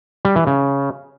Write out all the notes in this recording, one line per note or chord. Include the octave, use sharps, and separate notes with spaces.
G3
E3
C#3